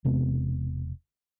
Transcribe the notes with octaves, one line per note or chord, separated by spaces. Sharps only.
E1 C3 G#3 B3